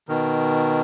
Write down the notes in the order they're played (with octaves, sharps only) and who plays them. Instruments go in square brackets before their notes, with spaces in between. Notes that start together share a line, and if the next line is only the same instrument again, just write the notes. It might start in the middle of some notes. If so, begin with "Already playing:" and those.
[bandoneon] B2 D#3